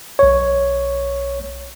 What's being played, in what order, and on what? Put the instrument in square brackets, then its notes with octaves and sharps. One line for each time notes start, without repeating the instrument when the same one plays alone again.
[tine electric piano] B1 C#5